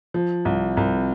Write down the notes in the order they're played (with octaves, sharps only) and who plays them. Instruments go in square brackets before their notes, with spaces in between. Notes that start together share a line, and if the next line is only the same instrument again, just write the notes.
[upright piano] F3
C2
C2